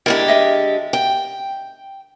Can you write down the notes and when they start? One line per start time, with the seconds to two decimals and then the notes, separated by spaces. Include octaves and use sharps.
0.06 D3 G#3 E4 G4 A#4 G5
0.28 D#5 E5
0.93 G5